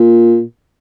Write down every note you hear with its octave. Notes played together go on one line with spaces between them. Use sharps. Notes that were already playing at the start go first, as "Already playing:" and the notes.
Already playing: A#2